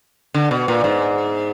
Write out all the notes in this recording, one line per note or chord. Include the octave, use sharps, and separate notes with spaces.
D3
B2
A#2
G#2